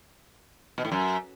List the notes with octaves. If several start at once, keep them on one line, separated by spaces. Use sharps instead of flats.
B2
A2
F#2